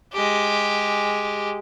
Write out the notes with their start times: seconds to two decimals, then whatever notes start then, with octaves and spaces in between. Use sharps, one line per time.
0.14 G#3 G4